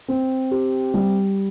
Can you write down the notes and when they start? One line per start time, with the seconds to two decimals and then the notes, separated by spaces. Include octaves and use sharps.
0.08 C4
0.51 G4
0.94 G3